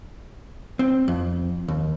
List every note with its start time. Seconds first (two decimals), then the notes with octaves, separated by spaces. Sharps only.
0.79 C4
1.08 F2
1.68 D#2